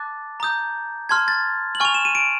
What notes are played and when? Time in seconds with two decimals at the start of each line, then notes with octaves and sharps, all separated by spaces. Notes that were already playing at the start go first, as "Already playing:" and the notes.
Already playing: A5 D6 F#6 A6
0.40 A#5 D#6 G6
1.09 A5 C6 F6 G#6
1.28 A6
1.75 F#7
1.80 G#5 C#6 F6 F7
1.94 E7
2.05 D#7
2.15 D7